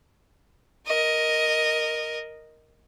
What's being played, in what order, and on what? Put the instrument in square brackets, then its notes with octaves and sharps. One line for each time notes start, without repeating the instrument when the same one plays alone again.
[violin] A#4 D#5